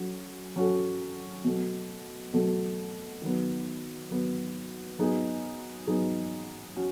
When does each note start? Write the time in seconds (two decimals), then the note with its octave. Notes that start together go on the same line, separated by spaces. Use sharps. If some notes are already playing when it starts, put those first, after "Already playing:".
Already playing: F#3 C#4 F#4 A4
0.56 F#3 C#4 F#4 A4
1.44 B2 F#3 A3
2.34 B2 F#3 A3
3.22 D#3 F#3 B3
4.10 D#3 F#3 B3
4.99 F#3 B3 D#4 G#4
5.87 F#3 B3 D#4 G#4
6.76 C#4 F#4